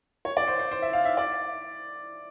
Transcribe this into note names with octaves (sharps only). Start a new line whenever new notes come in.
C#5
D5
C5
C5
C5
E5
F5
E5
D5